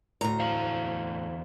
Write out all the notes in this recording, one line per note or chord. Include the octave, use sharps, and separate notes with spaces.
D2 A2 A#5
E2 C5 F5